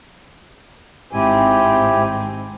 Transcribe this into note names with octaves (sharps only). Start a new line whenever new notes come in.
G#1 G#2 C4 E4 G4 G#5